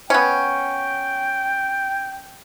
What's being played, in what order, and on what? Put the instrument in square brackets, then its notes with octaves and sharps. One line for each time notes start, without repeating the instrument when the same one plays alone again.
[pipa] B3 C#4 [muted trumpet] G5